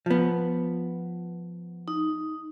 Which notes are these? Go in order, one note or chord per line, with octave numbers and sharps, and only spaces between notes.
F3 B3
D#4